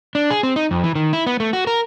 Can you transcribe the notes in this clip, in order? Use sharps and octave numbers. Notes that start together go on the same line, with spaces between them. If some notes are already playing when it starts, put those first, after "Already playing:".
D4
G#4
C4
D#4
F2
E3
D#3
E4
B3
A3
F#4
A#4